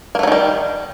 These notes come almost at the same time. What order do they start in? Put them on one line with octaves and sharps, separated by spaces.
A#3 A3 F#3 D#3 G3